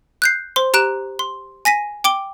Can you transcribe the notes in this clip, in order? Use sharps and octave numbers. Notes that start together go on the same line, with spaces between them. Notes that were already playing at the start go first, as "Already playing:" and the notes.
F#6 G6 C7
C5 C6
G4 A#5 F#6 D7 E7
C6
G#5 A#6 B6 D#7
G5 D6 D7 G7